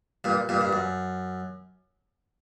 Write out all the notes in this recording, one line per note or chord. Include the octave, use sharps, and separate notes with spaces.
G2 A#2
G2 A#2
G2
F#2